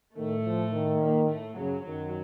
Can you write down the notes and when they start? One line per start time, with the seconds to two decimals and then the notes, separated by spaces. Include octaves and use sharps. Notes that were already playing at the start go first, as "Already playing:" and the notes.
0.16 A2 D#3 A3
0.45 F3
0.72 D#3
1.01 A#2 A#3
1.29 A2 A3
1.57 F#2 C#3 F#3
1.85 F#2 D#3 F#3